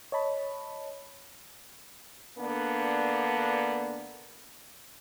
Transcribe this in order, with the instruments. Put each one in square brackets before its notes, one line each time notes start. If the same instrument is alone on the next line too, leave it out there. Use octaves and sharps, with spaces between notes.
[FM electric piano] C#5 D#5 A5 B5
[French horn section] D3 A#3 B3 D4